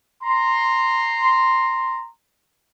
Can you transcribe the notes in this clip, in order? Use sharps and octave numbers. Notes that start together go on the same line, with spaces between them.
A#5 C6